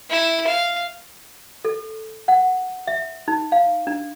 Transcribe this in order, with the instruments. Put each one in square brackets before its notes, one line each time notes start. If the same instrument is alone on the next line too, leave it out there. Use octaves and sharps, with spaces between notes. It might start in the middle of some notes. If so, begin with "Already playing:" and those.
[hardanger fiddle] E4
F5
[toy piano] A4
F#5
E5
D#4
F5
D4